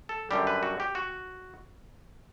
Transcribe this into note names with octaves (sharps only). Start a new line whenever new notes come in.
A4
F#2 D3 G3 G4
B4
F#4
G4
F#4